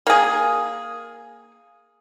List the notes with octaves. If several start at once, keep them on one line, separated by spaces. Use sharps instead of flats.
A#3 G#4